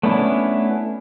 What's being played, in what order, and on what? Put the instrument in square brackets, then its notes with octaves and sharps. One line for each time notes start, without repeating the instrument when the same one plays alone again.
[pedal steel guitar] A3 B3 C#4 D4 E4